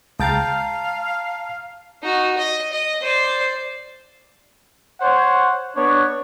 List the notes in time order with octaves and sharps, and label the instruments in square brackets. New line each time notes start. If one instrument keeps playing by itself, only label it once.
[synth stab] C#2 G5 A6 [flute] F5 [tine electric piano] A5 A#5
[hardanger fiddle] D#4 F#4
D#5
D#5
C5 D5
[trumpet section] C5 C#5 F#5
B3 D4 C#5